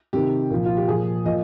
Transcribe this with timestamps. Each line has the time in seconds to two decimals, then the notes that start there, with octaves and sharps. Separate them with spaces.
0.13 C3 D#3 G4
0.51 A#2 F3
0.66 F4
0.77 G4
0.88 A#2 F3 G#4
1.26 A#2 F3 D#5